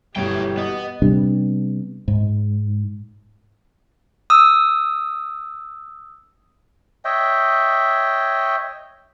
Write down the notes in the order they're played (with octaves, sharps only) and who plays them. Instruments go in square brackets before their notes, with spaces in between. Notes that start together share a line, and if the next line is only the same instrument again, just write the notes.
[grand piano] G1 B2 E3 [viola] G4 [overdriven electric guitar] C#5 G5
[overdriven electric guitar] B3 [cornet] D#5
[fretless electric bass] C3 G3 B3 D4
G#2
[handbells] D#6 E6
[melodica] C#5 D#5 E5 G5